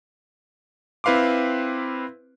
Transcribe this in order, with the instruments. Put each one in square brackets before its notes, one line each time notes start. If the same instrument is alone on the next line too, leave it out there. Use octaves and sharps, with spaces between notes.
[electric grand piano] C4 E4 B4 F5 C6 D6